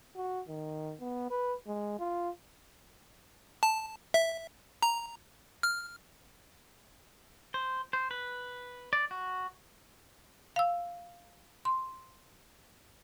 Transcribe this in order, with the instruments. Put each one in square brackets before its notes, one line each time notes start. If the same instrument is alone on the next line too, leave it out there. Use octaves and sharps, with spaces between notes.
[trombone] F#4
D#3
B3
B4
G#3
F4
[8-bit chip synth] A5
E5
A#5
F6
[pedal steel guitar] C5
C5
B4
D5
F#4
[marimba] F5 E6
C6